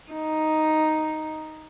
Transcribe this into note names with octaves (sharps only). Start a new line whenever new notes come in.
D#4